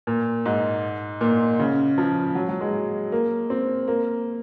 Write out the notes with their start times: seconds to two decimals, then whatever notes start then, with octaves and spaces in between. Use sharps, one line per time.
0.07 A#2
0.46 G#2
1.21 A#2
1.59 C#3
1.98 F3
2.35 F#3
2.49 F#3
2.61 G#3
3.12 A#3
3.50 C4
3.88 A#3